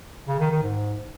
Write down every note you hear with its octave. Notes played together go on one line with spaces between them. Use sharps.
C#3
D#3
D#3
G#2